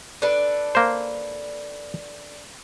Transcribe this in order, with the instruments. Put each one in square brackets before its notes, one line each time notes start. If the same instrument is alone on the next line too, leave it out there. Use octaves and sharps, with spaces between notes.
[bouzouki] D4 A4 B4
[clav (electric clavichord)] A#3 C5